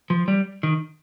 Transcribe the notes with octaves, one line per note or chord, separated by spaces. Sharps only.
F3
G3
D#3